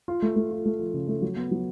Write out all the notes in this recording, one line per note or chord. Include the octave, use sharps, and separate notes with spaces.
F4
A3
A3
F4
A3
F3
C#3
A3
F#3
B3
F#3